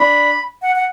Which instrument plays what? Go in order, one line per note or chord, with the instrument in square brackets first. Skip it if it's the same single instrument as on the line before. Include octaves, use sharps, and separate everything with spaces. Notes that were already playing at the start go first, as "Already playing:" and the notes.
Already playing: [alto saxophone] D4 [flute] B5
[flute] F#5
F#5